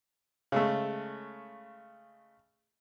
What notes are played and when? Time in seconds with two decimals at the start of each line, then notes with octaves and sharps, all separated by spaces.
0.52 C#3 G#3 A3